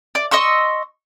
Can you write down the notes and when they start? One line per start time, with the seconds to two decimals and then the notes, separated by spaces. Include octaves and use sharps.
0.15 D5
0.31 D#5 C6 C#6 E6